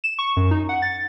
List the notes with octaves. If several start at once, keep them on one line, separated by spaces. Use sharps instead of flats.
E7
C#6
F#2
D#4
F#5
A6